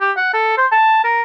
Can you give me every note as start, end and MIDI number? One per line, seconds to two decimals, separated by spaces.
0.01 0.11 67
0.17 0.32 78
0.33 0.52 69
0.57 0.66 72
0.72 1.04 81
1.04 1.22 70